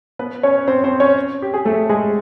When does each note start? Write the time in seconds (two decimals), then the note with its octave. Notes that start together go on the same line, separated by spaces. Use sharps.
0.19 B3 B4
0.43 C#4 C#5
0.68 C4 C5
0.84 C4 C5
1.00 C#4 C#5
1.42 G4
1.54 G#4
1.65 A3 A4
1.89 G#3 G#4